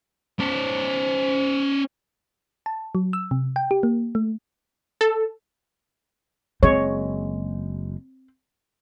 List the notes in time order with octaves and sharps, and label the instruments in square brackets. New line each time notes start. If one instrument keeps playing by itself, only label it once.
[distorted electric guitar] C#4 D5 [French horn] C5
[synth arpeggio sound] A5
F#3
E6
C3
G5
G4
A#3
A3
[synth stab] A4
[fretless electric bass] F#1 G#3 [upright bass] C4 [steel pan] C#5